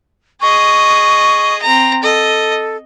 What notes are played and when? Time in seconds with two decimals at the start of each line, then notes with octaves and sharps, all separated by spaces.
0.42 G#4 D#5 C#6
1.62 C4 A#5
2.03 A4 D#5